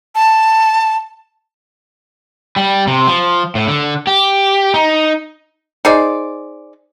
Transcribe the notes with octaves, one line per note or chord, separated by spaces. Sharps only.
A5
G3
C3
F3
A2
D3
G4
D#4
D#4 G#4 C5 D5